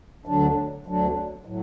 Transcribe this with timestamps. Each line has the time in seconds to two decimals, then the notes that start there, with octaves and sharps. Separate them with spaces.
0.26 D2 D3 F#3 D4
0.86 D2 D3 F#3 D4
1.45 A2 F#3